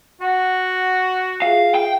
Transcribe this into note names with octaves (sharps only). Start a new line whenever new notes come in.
F#4 F#5
F4 G#4 E5 F5
G5